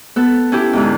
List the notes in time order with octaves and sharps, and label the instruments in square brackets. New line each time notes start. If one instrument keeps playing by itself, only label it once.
[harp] B3 A4
C#4 E4 G4
E2 G#2 D3